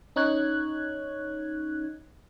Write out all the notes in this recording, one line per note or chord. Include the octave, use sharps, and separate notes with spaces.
C#4 D#4 C#5 F#6 G#6